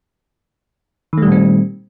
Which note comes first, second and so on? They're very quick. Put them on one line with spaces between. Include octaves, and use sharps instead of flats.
D#3 A3 G3 A#2 C4